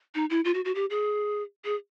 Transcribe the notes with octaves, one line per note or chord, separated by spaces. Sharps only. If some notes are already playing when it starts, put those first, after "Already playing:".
D#4
E4
F4
F#4
F#4
G4
G#4
G#4